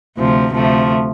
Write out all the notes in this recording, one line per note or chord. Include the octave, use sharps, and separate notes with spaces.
D2 C3 F3
D2 C3 F3 A3